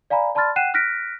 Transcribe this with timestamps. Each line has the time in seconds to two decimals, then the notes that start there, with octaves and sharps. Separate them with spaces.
0.10 D5 F5 G#5 A#5 B5
0.35 D5 A5 B5 C6 F6 A6
0.56 F#5 G5 F#6 C7 D#7 E7
0.74 F6 F#6 A#6 B6 D7